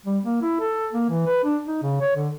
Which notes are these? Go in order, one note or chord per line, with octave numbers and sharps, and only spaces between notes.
G3
A#3
E4
A4
A#3
E3
B4
D4
D#4
C#3
C#5
D3